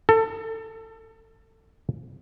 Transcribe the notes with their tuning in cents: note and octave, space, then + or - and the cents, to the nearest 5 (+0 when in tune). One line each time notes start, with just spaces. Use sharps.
A4 +25